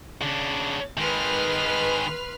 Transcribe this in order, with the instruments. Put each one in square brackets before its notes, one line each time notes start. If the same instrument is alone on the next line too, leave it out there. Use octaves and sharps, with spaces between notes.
[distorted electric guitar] C#3 D4
[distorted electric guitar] D#3 G#3 [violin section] B4 C6 F6